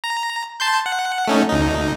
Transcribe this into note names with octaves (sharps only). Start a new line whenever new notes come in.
A#5
A5 C6 G6
F#5
A3 C#4 D#4
D2 D#4